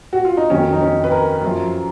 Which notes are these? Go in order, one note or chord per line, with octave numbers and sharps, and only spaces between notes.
F#4
F4
D#4
F2 D#3 F#3 C#4
D#4
C#4
B4
A#4
F#2 F3